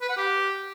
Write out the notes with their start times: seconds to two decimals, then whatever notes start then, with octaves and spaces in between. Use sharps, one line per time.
0.02 B4
0.09 F#5
0.17 G4